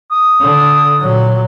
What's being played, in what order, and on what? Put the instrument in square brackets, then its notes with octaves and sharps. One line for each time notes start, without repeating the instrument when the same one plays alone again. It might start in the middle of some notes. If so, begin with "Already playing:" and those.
[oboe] D#6
[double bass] D3
A#2 F#3